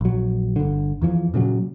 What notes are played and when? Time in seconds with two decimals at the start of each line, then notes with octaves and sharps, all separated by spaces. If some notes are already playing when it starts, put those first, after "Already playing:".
0.01 A#1 F#3
0.56 G1 D3
1.02 E2 E3 F3
1.34 A#2 C#3 F3 F#3